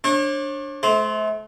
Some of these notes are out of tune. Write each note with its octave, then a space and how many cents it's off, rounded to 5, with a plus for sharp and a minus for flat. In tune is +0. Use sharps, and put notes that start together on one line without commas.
D4 +0 C#5 -40
A3 -35 C5 +0